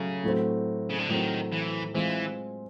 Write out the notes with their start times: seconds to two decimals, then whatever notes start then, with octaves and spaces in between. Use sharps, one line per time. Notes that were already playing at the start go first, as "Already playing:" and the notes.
Already playing: C#3 F#3 A3
0.24 A2 F#3 A3 C4
0.89 C#3
0.99 D3
1.08 A2 D#3 F#3 A3 C4
1.52 E3
1.94 E3 G#3 C4 F4